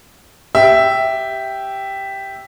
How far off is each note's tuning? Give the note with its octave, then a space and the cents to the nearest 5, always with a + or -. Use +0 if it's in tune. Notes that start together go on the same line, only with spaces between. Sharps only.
G4 -5 E5 +0